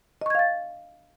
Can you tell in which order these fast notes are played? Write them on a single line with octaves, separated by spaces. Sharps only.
D#5 C#6 G#6 F5 A6